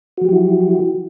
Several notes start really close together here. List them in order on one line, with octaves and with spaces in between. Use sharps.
F#4 F3 G4 F#3 E4